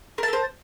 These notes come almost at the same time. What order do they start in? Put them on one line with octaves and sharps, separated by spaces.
A#4 A5 A4 C5